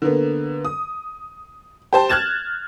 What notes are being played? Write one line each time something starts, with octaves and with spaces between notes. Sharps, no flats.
D3 A#3 B3
D#6
G4 C5 A5
F6 F#6 G#6 A6 E7